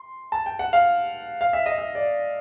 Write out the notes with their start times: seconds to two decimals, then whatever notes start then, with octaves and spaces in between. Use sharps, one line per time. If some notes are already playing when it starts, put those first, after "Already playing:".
Already playing: C6
0.32 A5
0.46 G5
0.59 F#5
0.73 F5
1.41 F5
1.53 E5
1.66 D#5
1.78 E5
1.95 D5